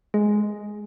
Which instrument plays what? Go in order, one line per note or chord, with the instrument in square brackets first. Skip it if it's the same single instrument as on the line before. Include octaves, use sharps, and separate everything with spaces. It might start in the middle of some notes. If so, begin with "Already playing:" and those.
[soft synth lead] G#3